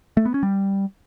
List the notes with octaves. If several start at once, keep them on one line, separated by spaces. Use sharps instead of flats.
A3
B3
C#4
G3